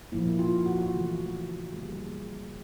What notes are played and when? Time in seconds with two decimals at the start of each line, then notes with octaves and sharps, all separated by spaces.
0.12 A#2 F3 A#3 E4
0.39 F4
0.66 F#4
0.76 F4
0.86 F#4
0.93 C#3 E3 A3
1.72 D3 G3 A#3 G#4
1.83 G4
1.93 G#4